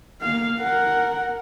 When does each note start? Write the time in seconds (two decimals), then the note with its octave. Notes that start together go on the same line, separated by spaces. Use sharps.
0.22 A#3 F5
0.60 A#4 F#5